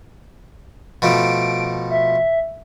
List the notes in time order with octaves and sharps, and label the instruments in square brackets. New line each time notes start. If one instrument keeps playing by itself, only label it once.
[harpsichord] B2 F3 A3 [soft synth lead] D7
[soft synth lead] E5